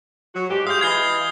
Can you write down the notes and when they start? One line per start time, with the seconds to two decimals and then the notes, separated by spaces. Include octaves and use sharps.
0.35 F#3 F#4
0.50 G#2 G4
0.67 G#3 F#4 F5 D#6 G6
0.81 E3 D#5 F5 G#6 C7 G7